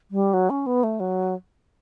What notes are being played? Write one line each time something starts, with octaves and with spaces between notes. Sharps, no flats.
G3
F#3
C#4
B3
A3
F#3